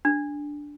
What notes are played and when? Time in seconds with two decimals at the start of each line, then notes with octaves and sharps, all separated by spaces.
0.05 D4